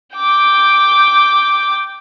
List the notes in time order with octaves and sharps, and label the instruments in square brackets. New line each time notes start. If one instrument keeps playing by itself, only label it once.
[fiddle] G5 D6